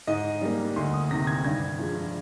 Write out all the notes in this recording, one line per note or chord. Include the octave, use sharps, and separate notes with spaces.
G#2 D#5
G3 A#3
D2 C6
D#6
C3 D#3 A#6
G#6
G2 G#6
F3 G#3